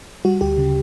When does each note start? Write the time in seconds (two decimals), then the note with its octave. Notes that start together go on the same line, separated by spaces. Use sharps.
0.25 G3 F#4
0.41 D2 G4
0.58 C#3